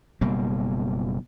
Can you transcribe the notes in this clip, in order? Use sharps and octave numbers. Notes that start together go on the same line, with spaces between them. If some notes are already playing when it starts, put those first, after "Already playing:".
F#1 B2 G3 A#3